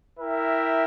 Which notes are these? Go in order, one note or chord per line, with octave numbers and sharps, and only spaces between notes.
E4 A#4 E5 G5